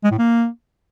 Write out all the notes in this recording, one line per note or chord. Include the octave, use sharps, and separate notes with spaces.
G#3
A2
A#3